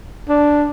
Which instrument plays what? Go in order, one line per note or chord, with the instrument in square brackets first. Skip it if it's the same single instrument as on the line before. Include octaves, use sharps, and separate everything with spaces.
[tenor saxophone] D4